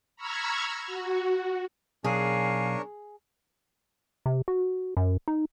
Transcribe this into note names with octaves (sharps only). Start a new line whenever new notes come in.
A#5 B5 C#6 E6 F6 G#6
F#4
B1 D4 G#4 A#4 C#5 F5 G#5
C3
F#4
F#2
D#4